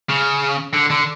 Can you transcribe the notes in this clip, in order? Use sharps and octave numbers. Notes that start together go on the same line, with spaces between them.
C#3
D3
D3